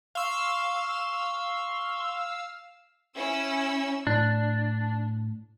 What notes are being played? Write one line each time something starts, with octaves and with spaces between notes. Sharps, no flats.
F5 C6 C#6 E6
C#4 E4 E6
A2 D4